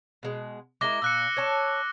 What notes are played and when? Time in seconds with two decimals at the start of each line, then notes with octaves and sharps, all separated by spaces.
0.23 B2 G#3
0.81 G#3 E4 A#4 D6 A#6 G7
1.02 A#2 E6 F#6 C#7
1.37 C#5 A5